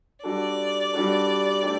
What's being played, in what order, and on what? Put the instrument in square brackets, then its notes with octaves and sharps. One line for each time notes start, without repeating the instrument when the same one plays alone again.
[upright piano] G3 D4 F#4 A4 [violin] D5
[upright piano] G3 D4 F#4 A4
A3 D4 G4